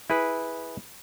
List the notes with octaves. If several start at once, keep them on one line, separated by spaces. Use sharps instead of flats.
E4 G#4 B4